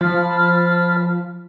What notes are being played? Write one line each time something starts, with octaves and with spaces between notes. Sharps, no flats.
F3 C5 A5 B5 F6